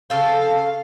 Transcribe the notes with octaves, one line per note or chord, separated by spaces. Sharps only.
C#3 A4 C5 F5